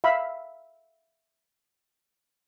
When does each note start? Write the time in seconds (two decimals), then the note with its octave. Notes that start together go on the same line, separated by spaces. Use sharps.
0.04 E5 F5 B5